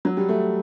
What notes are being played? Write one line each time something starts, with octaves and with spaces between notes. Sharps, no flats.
F#3
G3
A3